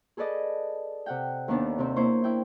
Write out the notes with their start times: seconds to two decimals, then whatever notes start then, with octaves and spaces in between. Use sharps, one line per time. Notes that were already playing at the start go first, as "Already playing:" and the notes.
0.17 G#4 A4 B4 D5 D#5
1.06 C3 F#5 G5
1.48 D#2 D#3 B3 D4
1.78 C3 C4
1.96 A#3 E4 C5 C#5
2.24 E4 G5